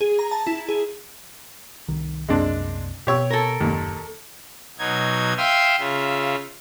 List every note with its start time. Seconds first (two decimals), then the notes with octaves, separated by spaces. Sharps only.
0.01 G#4
0.19 A#5
0.31 A5
0.47 E4
0.69 G#4
1.88 C2 D#3
2.28 C2 F#2 G#3 A#3 C4 D4
3.07 B2 G4 C#5 E6
3.30 A4 A#4
3.61 F#1 D#2 A#2
4.79 B2 F#3 D#4 G#6
5.37 E5 F5 G5 C6 D#6 E6
5.79 C#3 F4 E5